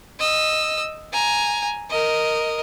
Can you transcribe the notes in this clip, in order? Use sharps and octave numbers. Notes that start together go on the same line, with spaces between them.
D#5 E6
G#5 A#5
A#4 D#5